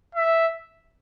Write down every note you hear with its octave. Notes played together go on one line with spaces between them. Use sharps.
E5